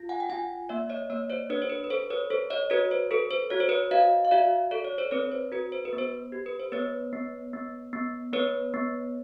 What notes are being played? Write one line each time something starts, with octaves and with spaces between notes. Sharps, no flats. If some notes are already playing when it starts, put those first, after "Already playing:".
Already playing: F4
F#5 G#5
G5
F4 F#5 G#5
A#3 D5 E5
C#5 D#5
A#3 C#5 D#5
C5 D5
D4 B4 C#5
C5
B4
B4
A4 C5
B4 C#5
A4 C5
C#5 D#5
F#4 B4 C#5
C5
A4 B4
C5
F#4 C#5
C5
B4 C#5
F#4 D#5 F5
F5
F#4 D5 E5
A4 D5
C#5
C5 D5
C4 B4 C#5
C5
F#4 B4
C5
B4
B3
C5
G4
B4
C5
B3 B4 C#5
B3
B3
B3
B3 B4 C#5
B3